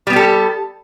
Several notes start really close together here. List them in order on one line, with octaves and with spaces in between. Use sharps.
G3 B3 G4 A4